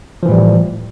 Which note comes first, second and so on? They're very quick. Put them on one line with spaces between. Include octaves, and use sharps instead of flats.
F3 E3 A2 G3